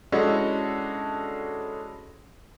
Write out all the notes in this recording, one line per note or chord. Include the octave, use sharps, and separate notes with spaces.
G#3 C#4 D4 E4 F#4 A4